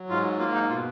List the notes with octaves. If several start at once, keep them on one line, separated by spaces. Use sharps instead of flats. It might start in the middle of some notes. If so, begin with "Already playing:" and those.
Already playing: F#3
G#2 F4
A#3 F4
D#4
B2 F4